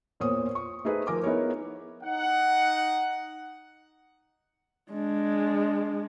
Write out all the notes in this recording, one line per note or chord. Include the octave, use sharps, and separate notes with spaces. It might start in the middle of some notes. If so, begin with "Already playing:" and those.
E2 A#2 C5 C#5 D#6
C#6
A3 D#4 G#4 B4 C5
F3 A#4 G#5 D6
B3 D#4 E4 G#4 A#4 C#5
D#4 F#5
G#3 D4